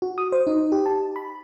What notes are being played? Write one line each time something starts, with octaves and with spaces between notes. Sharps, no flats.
F#4
D#6
C5
D#4
G4
A5
B5